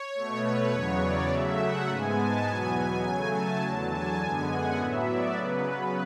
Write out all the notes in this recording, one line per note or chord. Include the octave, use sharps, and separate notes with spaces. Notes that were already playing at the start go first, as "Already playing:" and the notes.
Already playing: C#5
B2 A3
B4
E2 C#3 F#3 B3 C#5
D5
C#3 F#3 A3 E5
F#5
G#2 G#3 B3 G#5
A5
E2 B2 F#3 B3 G#5
G#5
C#3 F#3 A3 G#5
A5
E2 D3 F#3
G#5
F#2 D3 G#3 B3
F#5
A2 F#3 B3 E5
D5
C#3 F#3 B3 B4